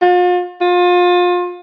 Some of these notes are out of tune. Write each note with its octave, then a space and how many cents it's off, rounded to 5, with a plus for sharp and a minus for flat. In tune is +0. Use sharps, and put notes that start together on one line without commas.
F4 +40
F4 +30